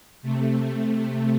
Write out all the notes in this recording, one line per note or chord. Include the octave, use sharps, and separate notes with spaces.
C3 A3
C3 A3